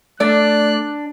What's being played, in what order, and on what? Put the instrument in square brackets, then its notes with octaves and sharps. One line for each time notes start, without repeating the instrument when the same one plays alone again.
[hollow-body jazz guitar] A3 [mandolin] D4 [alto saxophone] D5 [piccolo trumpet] F#6